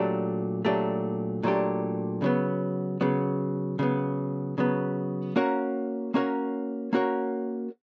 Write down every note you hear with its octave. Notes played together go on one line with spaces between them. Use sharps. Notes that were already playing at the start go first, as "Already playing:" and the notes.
Already playing: A#2 F#3 A3 D4 G4
A#2 F#3 A3 D4 G4
A#2 F#3 A3 D4 G4
C#3 F#3 B3
C#3 F#3 B3
C#3 F#3 B3
C#3 F#3 B3
A#3 C#4 F#4 A#4 C#5
A#3 C#4 F#4 A#4 C#5
A#3 C#4 F#4 A#4 C#5